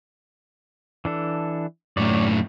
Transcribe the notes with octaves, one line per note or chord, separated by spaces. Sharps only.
E3 D4 A4
F#2 A2 C#5 D5